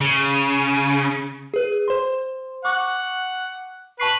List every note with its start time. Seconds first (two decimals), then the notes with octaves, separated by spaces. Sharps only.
0.01 C#3
1.54 G#4 B4
1.88 C5 C6
2.65 F#5 C#6 D6
4.00 B4 A5 C#6 C7